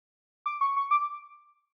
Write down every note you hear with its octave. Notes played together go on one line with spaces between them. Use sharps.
D6
C#6
C#6
D6